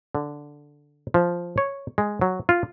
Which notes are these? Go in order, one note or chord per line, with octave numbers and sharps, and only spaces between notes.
D3
F3
C#5
G#3
F#3
F4